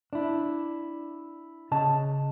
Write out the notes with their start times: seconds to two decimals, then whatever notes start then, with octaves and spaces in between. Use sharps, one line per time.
0.13 D4 E4
1.71 C#3 D#5 A5